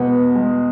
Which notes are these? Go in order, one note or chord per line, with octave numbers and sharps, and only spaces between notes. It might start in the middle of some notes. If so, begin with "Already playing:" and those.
Already playing: E2 B2 G#3 B3
G#3